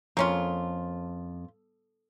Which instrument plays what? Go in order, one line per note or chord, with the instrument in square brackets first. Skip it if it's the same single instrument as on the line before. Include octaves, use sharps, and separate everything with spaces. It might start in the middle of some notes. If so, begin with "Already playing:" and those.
[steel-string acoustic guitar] F2 [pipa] A#3 C#4 F4